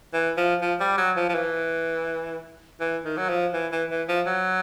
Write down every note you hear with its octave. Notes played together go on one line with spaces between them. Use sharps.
E3
F3
F3
G3
F#3
F3
F3
E3
E3
D#3
F#3
F3
E3
E3
E3
F3
F#3